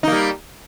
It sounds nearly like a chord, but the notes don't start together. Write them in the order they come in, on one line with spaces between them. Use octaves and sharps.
D#4 A#3 G3